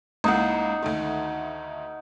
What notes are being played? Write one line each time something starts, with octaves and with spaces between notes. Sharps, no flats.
C#2 A#3 D#4 E4 F#5
D2 D#3 A3